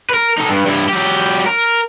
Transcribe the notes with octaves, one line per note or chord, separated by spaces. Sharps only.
A#4 B4
D#4 A4
G2
G2 E4
F#3 G4
A#4